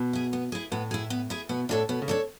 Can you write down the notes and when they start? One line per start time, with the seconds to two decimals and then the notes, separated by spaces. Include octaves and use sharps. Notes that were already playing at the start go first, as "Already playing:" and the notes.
Already playing: B2
0.13 E4 G#4
0.33 B3
0.52 E4 G#4
0.72 A2 B3
0.91 E4 G#4
1.10 B3
1.30 E4 G#4
1.49 B2 B3
1.69 A2 D4 A4 C#5
1.89 B2 B3
2.02 C#3
2.08 D4 A4 C#5